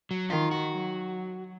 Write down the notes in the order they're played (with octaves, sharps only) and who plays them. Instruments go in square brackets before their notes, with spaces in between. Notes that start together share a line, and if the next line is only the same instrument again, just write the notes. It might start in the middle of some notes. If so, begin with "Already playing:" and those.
[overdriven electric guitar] F#3
[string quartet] D#3 [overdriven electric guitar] F4
[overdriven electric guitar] F#4
[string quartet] F#3